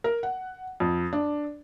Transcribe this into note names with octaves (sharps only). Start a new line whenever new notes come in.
A#4
F#5
F2
D4